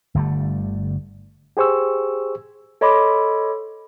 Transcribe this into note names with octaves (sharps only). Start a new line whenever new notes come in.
G1 D3 G3 A3
G4 G#4 C5 C#6 E6
A4 C#5 D#5 B5 C6 D6